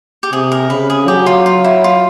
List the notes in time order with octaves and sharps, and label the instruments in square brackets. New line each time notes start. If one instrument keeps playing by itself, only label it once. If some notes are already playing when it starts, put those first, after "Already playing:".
[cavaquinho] G4
[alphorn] C3 [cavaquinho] G#4
[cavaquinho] A#4
[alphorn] C#3 [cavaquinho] B4
[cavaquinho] G#4
[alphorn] F#3 [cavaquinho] G4
[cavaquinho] F4
F4
E4
F4